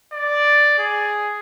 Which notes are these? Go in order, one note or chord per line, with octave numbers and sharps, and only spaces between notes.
D5
G#4